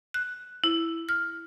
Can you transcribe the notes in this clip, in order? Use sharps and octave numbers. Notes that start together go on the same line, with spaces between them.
F#6
E4
F6